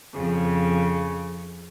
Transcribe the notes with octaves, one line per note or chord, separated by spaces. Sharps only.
F2 C#3